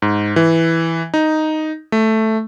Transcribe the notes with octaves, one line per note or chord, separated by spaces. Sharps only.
G#2
E3
D#4
A3